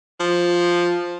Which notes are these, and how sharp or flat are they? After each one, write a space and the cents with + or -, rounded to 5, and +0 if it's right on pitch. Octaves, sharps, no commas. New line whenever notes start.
F3 +0